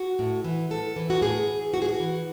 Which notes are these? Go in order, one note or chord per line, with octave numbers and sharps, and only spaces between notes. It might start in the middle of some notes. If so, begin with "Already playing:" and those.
Already playing: F#4
A2
E3
A2 A4
E3
F#4
A2 G#4
E3
A2 F#4
G#4
F#4
E3